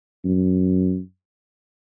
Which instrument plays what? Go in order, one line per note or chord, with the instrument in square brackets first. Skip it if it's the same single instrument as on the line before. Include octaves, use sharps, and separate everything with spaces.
[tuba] F#2